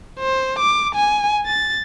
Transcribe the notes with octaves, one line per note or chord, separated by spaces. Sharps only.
C5
D6
G#5
A6